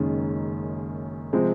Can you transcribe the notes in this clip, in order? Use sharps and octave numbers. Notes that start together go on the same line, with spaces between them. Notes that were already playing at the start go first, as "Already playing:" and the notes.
Already playing: F#1 F#2 D#3 G#3 C#4
C3 F3 G#3 C4